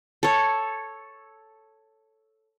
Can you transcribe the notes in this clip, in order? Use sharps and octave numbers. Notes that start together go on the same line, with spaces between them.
A4 C#5